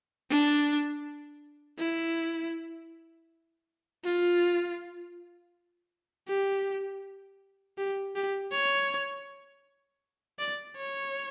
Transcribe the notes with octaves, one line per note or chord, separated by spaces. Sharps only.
D4
E4
F4
G4
G4
G4
C#5
D5
C#5